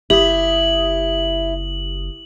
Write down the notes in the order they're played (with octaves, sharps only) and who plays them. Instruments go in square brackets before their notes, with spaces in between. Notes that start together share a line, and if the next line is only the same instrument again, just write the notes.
[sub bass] F#1 [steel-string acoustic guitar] E4 [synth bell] G4 D#6 [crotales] F#7